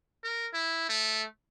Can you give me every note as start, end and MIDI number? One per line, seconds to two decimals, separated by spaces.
0.23 0.48 70
0.53 0.87 64
0.89 1.25 57